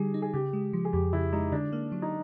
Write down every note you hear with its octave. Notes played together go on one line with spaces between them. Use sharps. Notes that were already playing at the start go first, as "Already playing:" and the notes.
Already playing: D3 G3 D#4 G4 G#4
D#4
G#4
C#3 G4
G#3
F3
G#4
F2 G4
C#3 E4
G#3 D#4
D3 D4
A#3
F#3
D#4